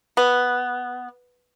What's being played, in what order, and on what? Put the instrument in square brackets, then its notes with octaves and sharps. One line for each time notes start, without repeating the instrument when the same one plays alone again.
[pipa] B3